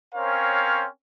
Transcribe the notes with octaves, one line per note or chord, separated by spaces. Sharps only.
C4 C#4 A#4 C5 C#5 F5